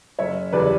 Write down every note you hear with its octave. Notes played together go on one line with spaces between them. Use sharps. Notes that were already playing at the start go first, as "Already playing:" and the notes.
F#1 C#5 E5
E2 C#3 G3 B4 D5